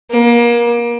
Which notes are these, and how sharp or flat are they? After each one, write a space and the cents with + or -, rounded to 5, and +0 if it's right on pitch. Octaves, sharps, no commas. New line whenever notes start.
A#3 +30